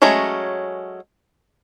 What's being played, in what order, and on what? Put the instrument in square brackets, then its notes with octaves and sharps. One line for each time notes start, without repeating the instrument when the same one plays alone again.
[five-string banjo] F#3 G#3 A3 C#4 A#5